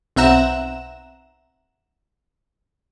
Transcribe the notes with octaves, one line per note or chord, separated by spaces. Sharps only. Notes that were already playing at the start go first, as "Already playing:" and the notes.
B1 C4 E5 F#5 A#5 E7